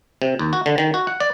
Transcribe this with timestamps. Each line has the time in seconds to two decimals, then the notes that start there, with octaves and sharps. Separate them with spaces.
0.22 C3
0.39 D#2
0.53 F#4
0.66 D3
0.78 D#3
0.94 F#4
1.07 F#5
1.20 D5